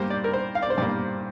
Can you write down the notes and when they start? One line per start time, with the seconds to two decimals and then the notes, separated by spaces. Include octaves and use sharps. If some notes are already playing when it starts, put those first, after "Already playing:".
Already playing: G2 G3 A#3 C5
0.10 D5
0.24 A#4
0.33 C5
0.55 F5
0.62 D5
0.70 C5
0.78 G2 G3 A#3 D5